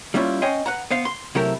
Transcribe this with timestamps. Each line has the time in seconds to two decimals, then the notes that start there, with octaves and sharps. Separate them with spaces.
0.14 G3 A#3 C#4 D4 E4 F4
0.42 C#4 C#5 D#5 G5 G#5 C6
0.66 B4 F#5 A#5
0.91 B3 C5 F5
1.05 C6
1.35 C3 F#3 A3 E4 G4 A#4